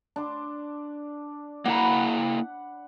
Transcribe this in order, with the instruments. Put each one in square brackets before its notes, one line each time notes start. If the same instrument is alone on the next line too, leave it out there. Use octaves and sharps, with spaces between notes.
[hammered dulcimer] D4 C6
[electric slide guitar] A#3 E4 A#5 [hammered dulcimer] F#5 B5